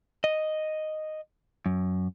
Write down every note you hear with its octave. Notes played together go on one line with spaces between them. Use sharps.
D#5
F#2